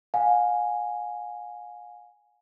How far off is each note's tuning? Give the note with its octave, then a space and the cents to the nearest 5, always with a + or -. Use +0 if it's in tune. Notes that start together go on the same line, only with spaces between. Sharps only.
F5 +40 G#5 +0